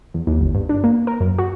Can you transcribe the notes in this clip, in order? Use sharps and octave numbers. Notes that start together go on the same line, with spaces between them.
E2
D#2
G1
G2
D4
A#3
A#4
F#2
F#4